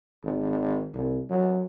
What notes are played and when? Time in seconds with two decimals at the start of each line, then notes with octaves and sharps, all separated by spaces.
0.23 G#1
0.94 C2
1.30 F#3